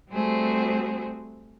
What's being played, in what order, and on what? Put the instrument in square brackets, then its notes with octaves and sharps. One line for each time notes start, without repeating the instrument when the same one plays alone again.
[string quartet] G3 A3 C4 F#4 G#4 C5